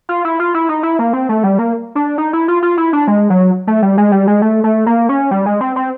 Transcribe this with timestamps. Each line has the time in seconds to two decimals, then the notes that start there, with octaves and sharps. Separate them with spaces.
0.09 F4
0.25 E4
0.40 F4
0.54 E4
0.69 D#4
0.83 E4
0.99 A#3
1.13 C4
1.29 A3
1.44 G3
1.59 A#3
1.95 D4
2.18 D#4
2.33 E4
2.48 F4
2.63 F4
2.78 E4
2.93 D4
3.08 G#3
3.30 F#3
3.67 A3
3.82 G3
3.98 G#3
4.12 G3
4.27 G#3
4.42 A3
4.64 A3
4.86 A#3
5.09 C#4
5.31 G3
5.46 G#3
5.61 C4
5.76 C4